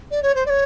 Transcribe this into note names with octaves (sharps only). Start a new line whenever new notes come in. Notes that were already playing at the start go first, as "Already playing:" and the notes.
D5
C#5
C5
D5
C#5